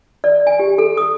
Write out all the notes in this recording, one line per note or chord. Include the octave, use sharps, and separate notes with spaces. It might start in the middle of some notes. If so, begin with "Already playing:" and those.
D5
G#5
G4
A4
D#6